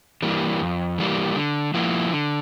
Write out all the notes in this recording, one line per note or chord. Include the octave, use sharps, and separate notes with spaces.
E3 G3 A#3
F2
E3 G3 A#3
D3
F3 A#3 E4
D3